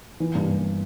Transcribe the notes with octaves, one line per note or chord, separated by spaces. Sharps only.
E3
G2
G2